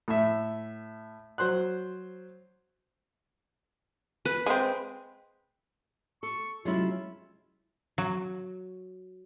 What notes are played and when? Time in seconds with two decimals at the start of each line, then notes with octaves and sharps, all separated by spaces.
0.08 A2 E5
1.38 F#3 C5 C6 F#6
4.25 B4
4.46 G#3 C4
6.23 A4 C#6
6.65 C3 F#3 G#3 C#4 E4 F4
7.98 F#3